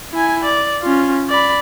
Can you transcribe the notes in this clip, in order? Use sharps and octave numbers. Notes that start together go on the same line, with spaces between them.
E4 G#5
D5
C#4 F4
D5 B5